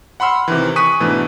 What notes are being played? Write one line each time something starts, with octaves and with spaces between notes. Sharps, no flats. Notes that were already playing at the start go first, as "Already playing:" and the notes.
F#5 B5 C6 E6 F6
C3 D#3 E3
G#5 C#6 D#6 F#6 B6 D#7
G#2 B2 E3 A3 D4